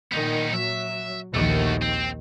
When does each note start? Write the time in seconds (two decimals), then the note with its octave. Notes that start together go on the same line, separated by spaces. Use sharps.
0.12 A#2 D#3 B3 D#4
0.54 F#3 E5
1.34 A#1 D#2 D#3 A3 F#4
1.82 C4